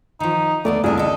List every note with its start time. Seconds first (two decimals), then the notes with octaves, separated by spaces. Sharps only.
0.20 D#3 F3 D#4
0.65 D#2 D3 A3 B3 D4 D5
0.84 F#1 C2 F#2 D4 E4 G#4
0.98 D3 A4 D#5